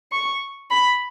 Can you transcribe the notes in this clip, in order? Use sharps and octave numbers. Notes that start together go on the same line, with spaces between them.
C#6
B5